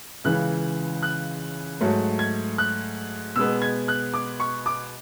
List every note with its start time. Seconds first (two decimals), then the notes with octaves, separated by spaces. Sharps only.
0.24 C#2 C#3 E3 F#6
1.03 F#6
1.81 G#2 F#3 A3
2.19 G#6
2.58 F#6
3.36 B2 G#3 B3 E6
3.62 G#6
3.88 F#6
4.14 D6
4.40 C#6
4.66 D6